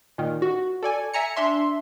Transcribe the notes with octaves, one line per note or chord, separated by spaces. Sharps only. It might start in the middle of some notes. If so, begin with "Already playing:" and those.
A#2 D#3
F#4
A4 D5 G#5
E5 G#5 A#5 C#7
D4 E5 C6